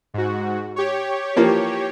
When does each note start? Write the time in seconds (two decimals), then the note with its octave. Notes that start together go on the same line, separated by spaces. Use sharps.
0.14 G#2 F#4
0.76 G4 C#5
1.36 E3 F3 A#3